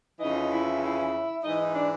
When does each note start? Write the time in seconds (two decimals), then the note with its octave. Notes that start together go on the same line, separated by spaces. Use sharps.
0.20 F2 C#3 E3 D#4 D#5
0.52 E4 E5
0.82 E4 E5
1.43 G#2 E3 D#4 D#5
1.59 D#4 D#5
1.75 D4 D5